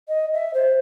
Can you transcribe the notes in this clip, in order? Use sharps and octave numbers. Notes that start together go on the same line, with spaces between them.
D#5
E5
C5